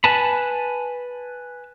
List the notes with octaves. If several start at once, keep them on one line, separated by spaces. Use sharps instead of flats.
B4 G#5 A5 B5